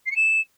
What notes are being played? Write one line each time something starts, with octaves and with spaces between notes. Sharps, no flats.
C7
C#7
E7